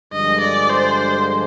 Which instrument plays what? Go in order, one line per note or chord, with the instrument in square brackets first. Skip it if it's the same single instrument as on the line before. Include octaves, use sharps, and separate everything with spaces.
[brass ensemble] G2 D3 F3 G#3 [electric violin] D#5
[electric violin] D5
C5